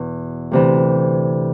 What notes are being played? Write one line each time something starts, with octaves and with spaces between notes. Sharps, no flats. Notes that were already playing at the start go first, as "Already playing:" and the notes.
Already playing: E2 B2
D2 C3 E3